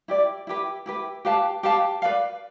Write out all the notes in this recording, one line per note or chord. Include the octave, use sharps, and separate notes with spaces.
E4 G4 D5
E4 G4 B4
E4 G4 B4
G4 B4 F5 A5
G4 B4 F5 A5
B4 D5 F5